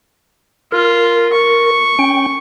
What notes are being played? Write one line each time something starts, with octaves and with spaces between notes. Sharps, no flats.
F4 A#4
C#6
C#4 G5